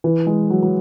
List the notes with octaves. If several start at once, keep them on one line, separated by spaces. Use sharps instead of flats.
E3
G#3
F#3
F#3